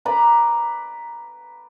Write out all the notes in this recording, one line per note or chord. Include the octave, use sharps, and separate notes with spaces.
B4 D5 A#5 B5